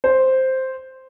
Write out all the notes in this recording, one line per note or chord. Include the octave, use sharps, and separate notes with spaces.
C5